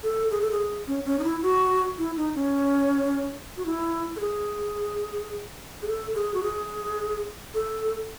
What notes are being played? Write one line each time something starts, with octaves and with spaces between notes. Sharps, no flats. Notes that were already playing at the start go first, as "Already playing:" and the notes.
A4
G#4
A4
G#4
C#4
C#4
D#4
E4
F#4
E4
D#4
C#4
F#4
E4
A4
G#4
G#4
A4
G#4
F#4
G#4
A4